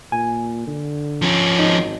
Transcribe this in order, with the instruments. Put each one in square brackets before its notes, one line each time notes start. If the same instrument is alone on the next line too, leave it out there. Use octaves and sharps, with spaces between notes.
[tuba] A#2 [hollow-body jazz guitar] G#5
[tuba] D3
[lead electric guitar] F3 C#4
[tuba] G#1 [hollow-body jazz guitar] D#4 D#5